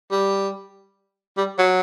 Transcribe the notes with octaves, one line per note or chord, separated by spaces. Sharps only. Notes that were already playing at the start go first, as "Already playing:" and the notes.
G3
G3
F#3